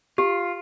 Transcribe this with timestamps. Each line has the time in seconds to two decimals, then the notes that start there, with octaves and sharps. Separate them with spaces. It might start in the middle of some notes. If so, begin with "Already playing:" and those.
0.18 F4 G4